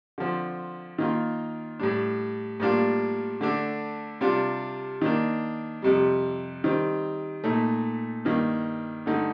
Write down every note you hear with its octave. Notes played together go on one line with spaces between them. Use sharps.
D3 F3 C4
D#3 A#3 F4
A2 G3 D4
A2 G3 A#3 D4 F4
D3 A3 D4
C3 G3 D4 F4
D#3 A#3 D4
F2 C3 G3
D#3 G3 C4
A#2 A3 D#4
G2 D#3 A#3
G2 D3 A3 D#4